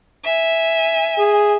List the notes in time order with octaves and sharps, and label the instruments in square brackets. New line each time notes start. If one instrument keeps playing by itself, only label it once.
[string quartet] E5 G#5
[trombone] G#4